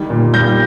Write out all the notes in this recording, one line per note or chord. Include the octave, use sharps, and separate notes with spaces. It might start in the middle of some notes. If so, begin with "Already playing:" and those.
Already playing: D#3 G3
A#2
G3 G6 A#6